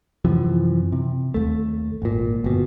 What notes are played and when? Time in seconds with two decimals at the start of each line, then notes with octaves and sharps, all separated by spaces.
0.25 F#2 C3 E3 F3
0.92 C3
1.34 D#2 A3
2.02 G#1 A#2
2.44 G1 B2